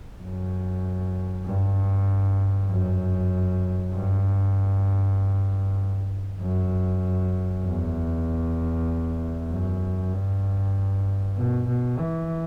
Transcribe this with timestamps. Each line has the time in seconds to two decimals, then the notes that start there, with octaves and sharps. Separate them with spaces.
0.22 F#2
1.46 G2
2.70 F#2
3.94 G2
6.41 F#2
7.65 E2
9.50 F#2
10.13 G2
11.36 B2
11.67 B2
11.99 E3